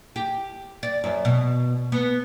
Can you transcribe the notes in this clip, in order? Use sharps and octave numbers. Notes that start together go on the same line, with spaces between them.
G4
D5
F#2
B2
B3